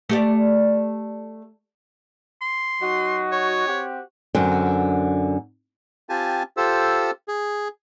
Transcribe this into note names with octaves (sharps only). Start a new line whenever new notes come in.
A3 G4 D5
C6
F#3 D#4 F#4
C#5
C4 F#4 G4
F#2 D3 C4
C4 F4 G4 G#5 A5
F4 G4 A4 C5 E6
G#4